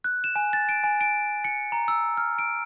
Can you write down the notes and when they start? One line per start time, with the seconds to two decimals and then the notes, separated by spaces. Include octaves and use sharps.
0.04 F#6
0.24 E7
0.36 G#5
0.53 A6
0.69 D7
0.84 G#5
1.01 D7
1.44 C#7
1.72 A#5
1.88 E6
2.17 F6
2.39 D7